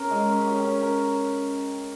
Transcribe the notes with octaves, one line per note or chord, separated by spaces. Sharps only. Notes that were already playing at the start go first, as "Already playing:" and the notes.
Already playing: C#4 A#4
G#3
C#4
G4
C#4
A#4